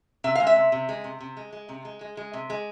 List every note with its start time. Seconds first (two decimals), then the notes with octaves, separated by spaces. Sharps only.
0.24 C3 E5
0.35 G#3 F5
0.47 E5
0.56 C3
0.72 C3
0.89 G#3
1.04 C3
1.21 C3
1.37 G#3
1.53 G#3
1.69 C3
1.85 G#3
2.01 G#3
2.17 G#3
2.33 C3
2.50 G#3